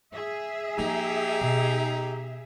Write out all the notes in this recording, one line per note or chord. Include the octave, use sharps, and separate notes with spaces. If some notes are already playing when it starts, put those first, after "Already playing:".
G#4 E5
F3 A#3 D#4 G4
B2